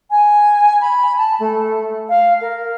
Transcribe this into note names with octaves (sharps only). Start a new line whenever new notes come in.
G#5
B5
A5
A3
F5
A#4